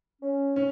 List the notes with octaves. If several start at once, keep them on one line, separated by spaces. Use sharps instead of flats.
C#4
C#4